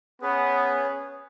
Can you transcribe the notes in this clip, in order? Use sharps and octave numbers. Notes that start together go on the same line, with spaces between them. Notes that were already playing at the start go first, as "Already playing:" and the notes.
B3 C#4 G#4 B4